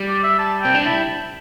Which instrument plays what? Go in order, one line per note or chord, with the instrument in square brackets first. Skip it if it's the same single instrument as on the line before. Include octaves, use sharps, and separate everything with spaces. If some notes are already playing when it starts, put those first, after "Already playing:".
Already playing: [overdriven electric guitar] G3
[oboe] D5
E5
A5
[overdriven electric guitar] C4 [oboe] G5
[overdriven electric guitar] D4
[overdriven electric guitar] E4 [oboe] A5